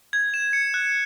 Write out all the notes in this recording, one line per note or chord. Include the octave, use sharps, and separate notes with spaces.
G#6
E7
C#7
F#6